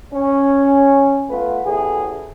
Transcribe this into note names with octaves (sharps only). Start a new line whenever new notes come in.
C#4
A3 B3 F4 B4
A1 E2 A2 G#4